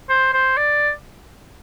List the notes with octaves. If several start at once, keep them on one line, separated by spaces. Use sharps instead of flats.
C5
C5
D5